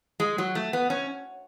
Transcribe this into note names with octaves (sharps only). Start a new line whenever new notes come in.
G#3
F#3
A3
B3
C#4